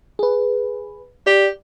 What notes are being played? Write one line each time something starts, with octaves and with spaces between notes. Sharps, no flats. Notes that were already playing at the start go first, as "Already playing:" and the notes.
G#4 B4
G4 D5